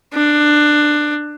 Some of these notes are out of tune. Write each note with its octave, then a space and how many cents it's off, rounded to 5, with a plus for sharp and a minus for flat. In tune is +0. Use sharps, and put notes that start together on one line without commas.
D4 +15